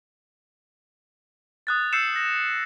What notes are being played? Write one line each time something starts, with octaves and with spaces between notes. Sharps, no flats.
D#6 F#6 A6
E6 G6 C7 C#7 E7
A#6